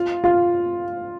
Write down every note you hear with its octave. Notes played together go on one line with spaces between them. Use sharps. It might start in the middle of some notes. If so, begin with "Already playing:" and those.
Already playing: F4
F4